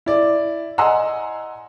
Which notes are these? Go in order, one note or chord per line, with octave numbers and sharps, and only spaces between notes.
E4 D5
D#5 F#5 G#5 A#5 C6 E6